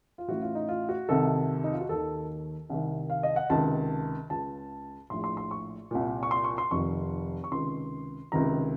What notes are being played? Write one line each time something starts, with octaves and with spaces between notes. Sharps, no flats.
F4
A1 A2 F#4
F4
D#4
F4
F#4
C2 C3 D#3 A4
D#4
F4
F#4
D#2 D#3 A4
C2 C3 D#3
F5
D#5
F#5
C#2 C3 D#3 A5
C#2 C#3 A5
A#1 A2 C6
C6
C6
C#6
C2 A#2
C#6
C6
C#6
C6
F1 F2 D#3 C#6
C#6
C#2 C3 D#3 C6
C#2 C3 D#3 A#5